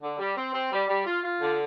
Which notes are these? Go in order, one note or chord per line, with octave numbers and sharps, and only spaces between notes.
D3
G3
C4
C4
G3
G3
F4
F4
D3